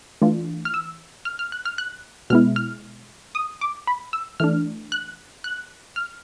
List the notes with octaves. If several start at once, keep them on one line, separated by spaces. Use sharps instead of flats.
E3 A3 D4 F4
F6
E6
F6
F6
F#6
F6
F#6
B2 G#3 B3 E4 F6
F6
D#6
D6
B5
E6
E3 A3 D4 F6
F#6
F#6
F6